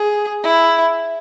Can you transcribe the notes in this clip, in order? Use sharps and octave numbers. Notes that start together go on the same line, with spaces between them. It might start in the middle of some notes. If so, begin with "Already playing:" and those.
Already playing: G#4
E4